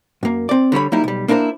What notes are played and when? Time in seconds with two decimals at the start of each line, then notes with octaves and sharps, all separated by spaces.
0.23 F#2 A#3
0.49 C4 D5
0.72 D3 G3 C#5 B5
0.92 F#3 G3 A#3 D#4 E4
1.04 B1 G3
1.28 A#3 D4 E4 A#4 C5